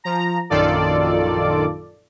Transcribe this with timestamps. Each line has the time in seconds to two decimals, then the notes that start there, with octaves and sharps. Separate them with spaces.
0.04 F3 A#5
0.50 A#1 F#2 D#3 F4 A4 D5